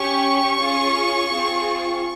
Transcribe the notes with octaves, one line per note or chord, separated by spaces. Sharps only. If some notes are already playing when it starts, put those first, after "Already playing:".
Already playing: C#4 G4 C#6
C#4 F4 G#4
C4 F4 G#4